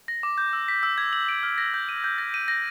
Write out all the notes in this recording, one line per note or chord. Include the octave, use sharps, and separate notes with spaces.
A#6
D6
G6
E6
B6
E6
G#6
F#7
D7
F6
A#6
G6
D#7
G6
A#6
D#7
A#6